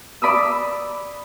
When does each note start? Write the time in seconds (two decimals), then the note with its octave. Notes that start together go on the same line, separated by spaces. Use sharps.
0.22 D5 B5 D#6 E6